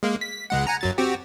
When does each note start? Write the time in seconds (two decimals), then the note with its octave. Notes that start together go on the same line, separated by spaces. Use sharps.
0.03 G#3 A#3
0.21 B6
0.50 C#2 G#3 F#5
0.67 F#5 G#5 A#5
0.81 F#2 F#3 A6
0.98 C4 F#4 G4